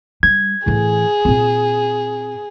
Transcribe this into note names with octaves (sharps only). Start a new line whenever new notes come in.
G3 G#6
A2 E3 G#4
A#2 C4